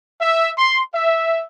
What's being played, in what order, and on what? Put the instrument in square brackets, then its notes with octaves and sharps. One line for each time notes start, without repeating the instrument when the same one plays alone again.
[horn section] E5
C6
E5